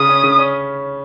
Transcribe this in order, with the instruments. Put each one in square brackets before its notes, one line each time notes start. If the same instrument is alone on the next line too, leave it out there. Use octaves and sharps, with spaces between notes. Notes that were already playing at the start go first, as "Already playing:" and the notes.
Already playing: [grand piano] C#3 [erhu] D#6
[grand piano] C#4
C#3
C#4